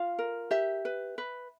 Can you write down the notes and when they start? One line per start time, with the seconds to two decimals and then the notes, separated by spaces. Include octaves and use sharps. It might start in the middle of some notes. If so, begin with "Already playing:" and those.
Already playing: F4 F5
0.19 A#4
0.51 G4 E5
0.85 B4
1.18 B4